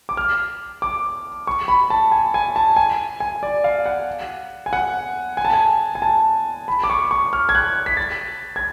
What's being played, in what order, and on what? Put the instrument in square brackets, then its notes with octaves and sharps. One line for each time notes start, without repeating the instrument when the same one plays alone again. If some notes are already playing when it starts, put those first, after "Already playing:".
[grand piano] D6
F6
D6
C#6
B5
A5
G#5
G#5
A5
G#5
G#5
D5
F5
F#5
G#5
F#5
G#5
A5
G#5
G#5
A5
B5
D6
C#6
C#6
F6
G#6
F#6
B6
A6
G#6